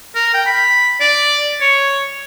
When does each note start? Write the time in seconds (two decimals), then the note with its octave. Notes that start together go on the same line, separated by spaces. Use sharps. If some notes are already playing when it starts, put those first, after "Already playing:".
0.15 A#4
0.34 G5
0.46 B5
1.01 D5
1.61 C#5